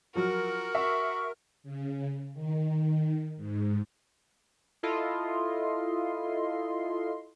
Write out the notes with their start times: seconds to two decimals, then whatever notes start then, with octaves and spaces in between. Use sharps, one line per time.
0.15 F3 F#3 F#4 A#4
0.75 E5 C#6
1.63 C#3
2.34 D#3
3.37 G#2
4.83 E4 F4 A4 D#5 C6